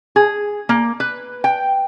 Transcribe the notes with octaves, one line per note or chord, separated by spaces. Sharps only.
G#4
A#3
B4
G5